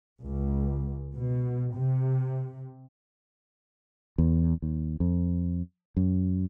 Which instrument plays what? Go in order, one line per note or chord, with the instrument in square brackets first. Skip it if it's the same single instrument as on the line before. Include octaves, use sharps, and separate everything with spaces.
[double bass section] C#2
B2
C3
[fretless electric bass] E2
D#2
F2
F#2